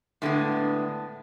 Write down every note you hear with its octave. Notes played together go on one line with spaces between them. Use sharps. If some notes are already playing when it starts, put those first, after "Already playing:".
A2 D3 G#3 B3